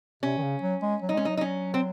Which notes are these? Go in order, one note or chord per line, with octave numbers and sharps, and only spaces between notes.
C3 C#4
D#3
C#3
F#3
G#3
F#3
D#4
G#3 C#4
F#3 D#4
D#4
C#4
C4